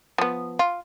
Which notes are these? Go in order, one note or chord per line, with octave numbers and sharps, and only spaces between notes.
F3 B3
F4